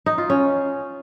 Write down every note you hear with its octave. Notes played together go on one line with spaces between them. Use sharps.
D#4
F4
C#4